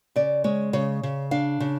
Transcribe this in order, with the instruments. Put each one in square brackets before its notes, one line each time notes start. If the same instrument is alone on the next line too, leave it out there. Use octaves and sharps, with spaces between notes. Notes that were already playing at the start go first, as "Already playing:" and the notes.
[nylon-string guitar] C#3 D5
G#3 C#5
C#3 C#5
C#3
D4 F5
C#3